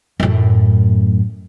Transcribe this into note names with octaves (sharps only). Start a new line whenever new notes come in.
F#2 A2